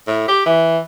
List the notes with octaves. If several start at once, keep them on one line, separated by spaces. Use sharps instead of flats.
A2
G4
E3